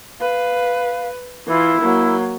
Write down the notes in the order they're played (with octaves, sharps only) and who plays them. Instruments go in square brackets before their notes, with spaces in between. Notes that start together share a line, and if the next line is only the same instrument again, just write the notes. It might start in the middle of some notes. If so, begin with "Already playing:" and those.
[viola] B4 [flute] F5
[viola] E3 F4 [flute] E4
[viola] F#3 A#3